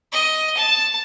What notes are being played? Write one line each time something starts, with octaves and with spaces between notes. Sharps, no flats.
D#5
A5